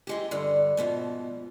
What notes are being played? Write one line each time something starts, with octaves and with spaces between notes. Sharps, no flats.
E3 G#3 G4
G2 D3
G#2 B2 E3 F3